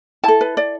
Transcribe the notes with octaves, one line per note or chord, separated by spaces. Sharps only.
E4 A4 A5
B4
D5